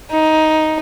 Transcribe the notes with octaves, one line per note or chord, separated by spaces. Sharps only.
D#4